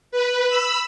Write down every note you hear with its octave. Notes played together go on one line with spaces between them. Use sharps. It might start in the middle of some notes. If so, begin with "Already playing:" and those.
B4
B5 E6